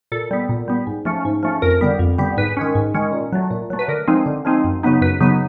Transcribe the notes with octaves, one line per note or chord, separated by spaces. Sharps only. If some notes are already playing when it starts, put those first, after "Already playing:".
A#2 A4
G3 B3
A#2
G3 B3
G#2
F3 A3 C#4
G#2
F3 A3 C#4
F2 A#4
D3 G3 B3
F2
D3 G3 B3
G#2 B4
D#3 G#3 C#4
G#2
D#3 G#3 C#4
A#2
F#3 A3
A#2
F#3 A3
B4
D3 A#4
F3 G#3 C4 D#4
D3
F3 G#3 C4 D#4
F#2
C#3 F#3 B3 D#4
F#2 B4
C#3 F#3 B3 D#4